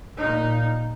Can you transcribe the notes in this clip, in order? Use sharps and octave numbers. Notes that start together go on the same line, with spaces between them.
A#2 D#4